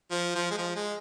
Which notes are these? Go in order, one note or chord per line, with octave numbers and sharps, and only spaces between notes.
F3
F3
G#3
F3
G#3